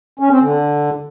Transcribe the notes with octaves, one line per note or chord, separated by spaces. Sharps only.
C#4
C4
D3